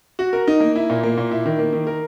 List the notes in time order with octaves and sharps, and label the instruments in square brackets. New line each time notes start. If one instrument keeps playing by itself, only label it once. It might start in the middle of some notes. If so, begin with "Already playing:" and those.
[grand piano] F#4
A#4
D#4
A#3
E4
A#2
A#3
A#2
E4
D#3
A#3
D#3
A#4